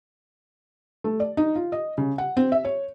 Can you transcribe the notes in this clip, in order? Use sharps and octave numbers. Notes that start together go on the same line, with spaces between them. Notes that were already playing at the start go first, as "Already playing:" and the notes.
A3
D5
D#4
F4
D#5
C#3
F#5
C4
E5
C#5